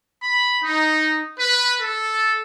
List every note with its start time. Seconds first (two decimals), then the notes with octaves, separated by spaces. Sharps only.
0.23 B5
0.62 D#4
1.38 B4
1.81 A4